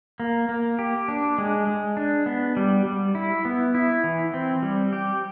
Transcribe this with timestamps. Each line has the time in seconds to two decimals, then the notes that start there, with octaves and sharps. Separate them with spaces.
0.20 A#3
0.49 A#3
0.79 G4
1.08 D4
1.38 G#3
1.67 G#3
1.97 D4
2.26 B3
2.57 G3
2.85 G3
3.15 E4
3.45 B3
3.75 E4
4.04 E3
4.34 C4
4.62 G3
4.93 G4